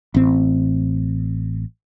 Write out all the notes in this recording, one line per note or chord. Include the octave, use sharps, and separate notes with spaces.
A1 C4